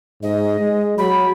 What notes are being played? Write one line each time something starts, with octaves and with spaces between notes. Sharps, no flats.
G#2 D#5
G#3
F#3 B5